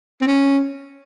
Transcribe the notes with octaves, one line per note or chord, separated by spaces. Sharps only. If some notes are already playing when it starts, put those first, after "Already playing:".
C4
C#4